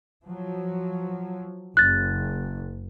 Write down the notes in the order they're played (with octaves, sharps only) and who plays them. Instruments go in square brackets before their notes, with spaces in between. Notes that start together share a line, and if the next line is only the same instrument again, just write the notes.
[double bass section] F3 F#3
[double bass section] F#1 [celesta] F#6 A6